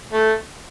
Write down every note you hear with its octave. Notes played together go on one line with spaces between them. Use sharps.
A3